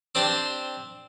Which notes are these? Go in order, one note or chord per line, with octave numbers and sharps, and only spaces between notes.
C4 D4 G4 C5